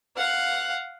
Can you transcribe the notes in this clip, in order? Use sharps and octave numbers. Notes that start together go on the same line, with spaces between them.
F5 F#5